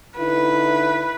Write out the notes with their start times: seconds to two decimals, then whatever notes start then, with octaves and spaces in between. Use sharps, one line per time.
0.18 D3 D#4 E4 B4